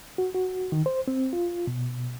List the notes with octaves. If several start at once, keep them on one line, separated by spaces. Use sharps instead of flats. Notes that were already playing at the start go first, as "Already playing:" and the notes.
F#4
F#4
D#3
C5
C4
F4
B2